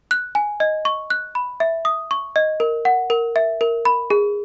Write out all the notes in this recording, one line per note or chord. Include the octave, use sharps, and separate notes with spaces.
F#6
G#5
D#5
C#6
F#6
B5
E5
D#6
C#6
D#5
A#4
F#5
A#4
E5
A#4
B5
G#4